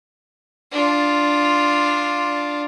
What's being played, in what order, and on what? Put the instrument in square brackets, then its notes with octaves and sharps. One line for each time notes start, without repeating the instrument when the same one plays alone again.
[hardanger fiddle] D4 F4